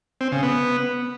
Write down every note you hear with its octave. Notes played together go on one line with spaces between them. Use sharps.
C4
C#3
B3